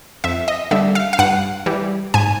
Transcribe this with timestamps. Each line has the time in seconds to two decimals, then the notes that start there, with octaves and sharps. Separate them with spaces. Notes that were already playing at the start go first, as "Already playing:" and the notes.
0.24 F2 E5
0.48 D#5
0.71 D3 G3 E5
0.95 F5
1.13 F5
1.19 G2 F#5
1.66 E3 G3
2.14 G#2 G#5